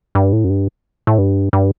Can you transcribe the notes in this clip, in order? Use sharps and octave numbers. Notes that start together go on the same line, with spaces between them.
G2
A2
F#2
G2
A2
G2
G2